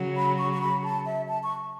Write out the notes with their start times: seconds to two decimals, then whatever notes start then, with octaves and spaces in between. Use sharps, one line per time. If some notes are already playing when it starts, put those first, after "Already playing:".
Already playing: C#3 F#3
0.16 B5
0.39 C#6
0.53 C#6
0.61 B5
0.84 A5
1.06 E5
1.28 A5
1.43 C#6